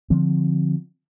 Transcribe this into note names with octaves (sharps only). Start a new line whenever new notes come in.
D3 F3 C4